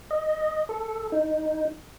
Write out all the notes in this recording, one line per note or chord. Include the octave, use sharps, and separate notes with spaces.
D#5
A4
D#4